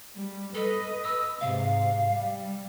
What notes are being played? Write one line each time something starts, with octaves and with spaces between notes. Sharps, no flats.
G3
A4 B4 D#5
E6
G#2 C3 F5
G3